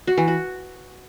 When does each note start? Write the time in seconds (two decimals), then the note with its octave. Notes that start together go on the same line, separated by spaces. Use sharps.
0.07 F#4
0.18 E3
0.28 F#4